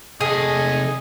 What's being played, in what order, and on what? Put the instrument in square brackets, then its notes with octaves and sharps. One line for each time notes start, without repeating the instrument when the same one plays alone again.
[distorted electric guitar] C3 A4 [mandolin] G#4 [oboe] D#5